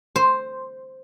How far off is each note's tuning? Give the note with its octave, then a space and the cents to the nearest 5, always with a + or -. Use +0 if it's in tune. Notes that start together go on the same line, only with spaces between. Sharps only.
C5 +0